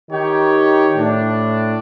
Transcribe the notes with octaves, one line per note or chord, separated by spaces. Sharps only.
D#3 D#4 G4 C#5 G5
A2 D4